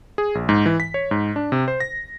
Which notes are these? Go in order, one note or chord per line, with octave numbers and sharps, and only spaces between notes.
G#4
A#1
G#2
E3
B6
C#5
G#2
D4
C3
C5
A#6